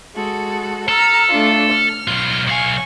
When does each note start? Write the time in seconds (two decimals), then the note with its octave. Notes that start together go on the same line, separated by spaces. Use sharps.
0.16 G#3 F#4 A4
0.89 A4 A#5 E6 F6
1.30 A3 D4 F4
1.72 F6
2.08 B1 F4
2.47 B1 F5 G#5 C#6